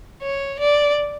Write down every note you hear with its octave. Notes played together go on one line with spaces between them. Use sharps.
C#5
D5